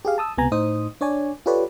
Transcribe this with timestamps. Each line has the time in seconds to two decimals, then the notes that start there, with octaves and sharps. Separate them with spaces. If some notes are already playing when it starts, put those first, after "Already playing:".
0.05 G4 G#4 F5
0.18 A5 D#6 E6
0.38 C#2 C3 B3 G#5 A#5
0.52 A2 D#4 C5 D#6
1.01 D4 C#5 D5 G#5
1.46 F4 G4 A4 B4 C#5 D5